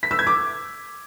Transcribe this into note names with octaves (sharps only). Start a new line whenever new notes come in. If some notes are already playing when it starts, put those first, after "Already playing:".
B6
E6
G#6
D6